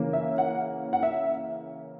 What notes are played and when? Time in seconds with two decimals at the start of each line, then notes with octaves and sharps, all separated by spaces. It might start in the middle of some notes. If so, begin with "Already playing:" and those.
Already playing: C#3 E3 A#3 C#4
0.13 E5
0.38 F#5
0.93 F#5
1.03 E5